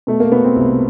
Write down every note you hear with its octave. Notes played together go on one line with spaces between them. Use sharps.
B2 A3
A#3
B2 B3
C4
C2